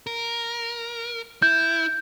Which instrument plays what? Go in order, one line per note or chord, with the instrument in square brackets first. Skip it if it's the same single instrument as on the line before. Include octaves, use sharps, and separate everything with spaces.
[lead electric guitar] A#4
[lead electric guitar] E4 [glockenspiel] G6